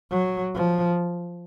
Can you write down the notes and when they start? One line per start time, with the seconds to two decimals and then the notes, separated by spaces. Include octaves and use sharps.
0.11 F#3
0.55 F3